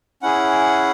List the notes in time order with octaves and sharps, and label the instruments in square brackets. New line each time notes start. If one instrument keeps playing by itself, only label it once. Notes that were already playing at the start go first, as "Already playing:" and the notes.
[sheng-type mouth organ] C#4 E4 G#4 F#5